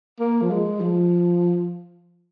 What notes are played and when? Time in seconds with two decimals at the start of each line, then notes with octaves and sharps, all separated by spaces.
0.20 A#3
0.41 F3
0.51 G#3
0.80 F3